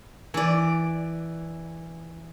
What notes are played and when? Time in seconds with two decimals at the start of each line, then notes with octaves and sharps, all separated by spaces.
0.34 E3 D5